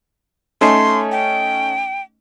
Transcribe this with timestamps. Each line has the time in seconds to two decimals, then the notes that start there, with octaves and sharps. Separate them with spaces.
0.61 A3 C#4 D#4 C6
1.12 G5